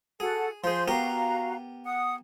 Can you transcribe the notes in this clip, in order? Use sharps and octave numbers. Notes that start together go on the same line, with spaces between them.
F#4 G#4 A4 F#5
F3 G#4 C5 C6 G6
B3 F#4 G4 A#4 F5 A#5
F#5 D#6